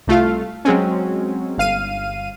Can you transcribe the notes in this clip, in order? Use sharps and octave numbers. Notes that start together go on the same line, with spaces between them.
C2 A3 F4 F5
F#3 G#3 C4 C#4
G1 F5 D#7